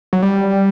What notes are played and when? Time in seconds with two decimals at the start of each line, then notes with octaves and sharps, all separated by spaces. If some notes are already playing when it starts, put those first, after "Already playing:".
0.13 F#3
0.23 G3